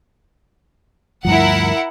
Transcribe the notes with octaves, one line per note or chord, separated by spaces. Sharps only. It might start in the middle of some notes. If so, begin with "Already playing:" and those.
D2 G2 F3 E4 A#4 F#5